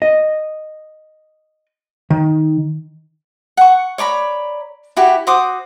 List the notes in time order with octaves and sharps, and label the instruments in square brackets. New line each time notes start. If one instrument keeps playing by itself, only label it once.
[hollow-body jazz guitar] D#5
D#3
[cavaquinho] F#5 C#6
C#5 D5 A#5 B5
E4 F#4 G4
F#4 C5 D6 D#6